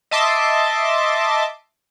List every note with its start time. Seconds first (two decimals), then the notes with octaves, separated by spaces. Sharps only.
0.11 D#5 E5 A5 C6 D6